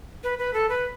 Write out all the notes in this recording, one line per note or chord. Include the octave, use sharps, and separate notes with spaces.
B4
B4
A4
B4